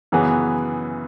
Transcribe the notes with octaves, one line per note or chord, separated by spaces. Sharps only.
F#2 C#3 E3 B3 G#4